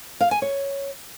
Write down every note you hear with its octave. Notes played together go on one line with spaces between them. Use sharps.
F5
G#5
C#5